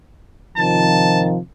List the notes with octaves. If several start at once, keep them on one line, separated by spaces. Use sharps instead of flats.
C3 D#3 F3 A5